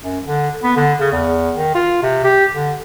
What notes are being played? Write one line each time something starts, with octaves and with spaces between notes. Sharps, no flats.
F#2
D3
B3
D3
C#3
E2
D#3
F4
C3
G4
D3